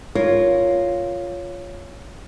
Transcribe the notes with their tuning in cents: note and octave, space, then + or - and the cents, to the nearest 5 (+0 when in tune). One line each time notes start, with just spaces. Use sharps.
F4 +0 A#4 +0 C#5 +5